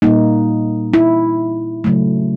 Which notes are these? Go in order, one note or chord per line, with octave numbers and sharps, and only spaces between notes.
A#2 G3 A#3 D#4
E4
C#3 F#3 A3